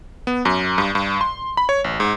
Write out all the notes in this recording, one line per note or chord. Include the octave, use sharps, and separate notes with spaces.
B3
F#2
G2
G2
C6
B5
C#5
A1
G#2